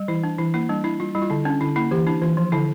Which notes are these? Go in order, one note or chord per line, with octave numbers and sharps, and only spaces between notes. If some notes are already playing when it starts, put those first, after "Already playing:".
Already playing: G3
E3 E4
D4
E3 E4
A#3 E4
G3 D4
D4 E4
G3 F4
G3 E4
F4
D3 E4
C#4 D4
D3 E4
A#3 E4
E3 G4
D4 E4
E3 F4
F3
D3 E4